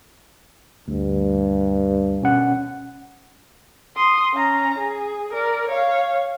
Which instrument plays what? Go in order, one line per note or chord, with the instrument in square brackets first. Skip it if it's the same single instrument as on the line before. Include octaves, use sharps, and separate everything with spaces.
[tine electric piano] D2 [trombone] G2
[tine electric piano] B2 C#4 F#5
[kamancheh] C6 D#6
C#4 A#5
G#4
A#4 D5
C#5 F5